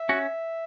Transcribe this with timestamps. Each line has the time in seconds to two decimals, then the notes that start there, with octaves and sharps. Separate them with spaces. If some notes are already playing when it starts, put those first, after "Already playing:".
Already playing: E5
0.09 C#4 F#4